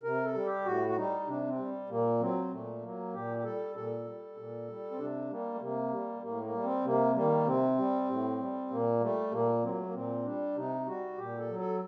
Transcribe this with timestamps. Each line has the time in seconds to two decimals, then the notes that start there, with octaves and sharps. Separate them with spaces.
0.03 C3 A#4
0.25 A4
0.35 G3
0.45 G4
0.65 A2 F#4
0.89 F#4
0.97 G3 D#4
1.27 C3 D4
1.48 C4
1.59 G3
1.89 A#2 A#3
2.20 F#3 C4
2.51 A#2 A3
2.82 F#3 A#3
3.13 A#2 G4
3.38 G4
3.44 G3 A4
3.75 A#2 A4
4.06 G3
4.37 A#2
4.68 G3
4.92 C4
4.98 C3 D4
5.30 G3 A#3
5.54 A3
5.61 C3 A#3
5.91 G3
6.22 A2 A#3
6.43 A#3
6.53 G3
6.64 C4
6.85 C3 A#3
7.15 D#3 G3 A#3
7.46 C3 C4
7.78 G3
8.09 A2
8.39 G3
8.70 A#2 A#3
9.00 G3 A3
9.32 A#2 A#3
9.63 F#3 C4
9.70 A#3
9.78 A3
9.86 A#3
9.94 A#2 C4
10.24 G3 D4
10.56 C3 D#4
10.86 G3 F#4
11.17 A#2 G4
11.38 A4
11.49 F#3
11.59 A4